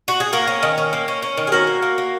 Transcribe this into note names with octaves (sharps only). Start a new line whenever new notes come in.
F#4
G#4
A#3 F#4 A#4
C#4
D#3
C#4
A#3
C#4
C#4
D#3
G#4
C#4 F#4 A#4
A#3
A#3
A#3